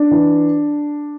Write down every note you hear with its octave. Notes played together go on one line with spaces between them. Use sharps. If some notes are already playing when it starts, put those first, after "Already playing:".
Already playing: D4
E3